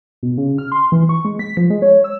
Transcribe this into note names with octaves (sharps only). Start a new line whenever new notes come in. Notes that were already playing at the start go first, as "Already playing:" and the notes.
B2
C#3
F6
C6
E3
C#6
G#3
B6
F3
G#3
C#5
E6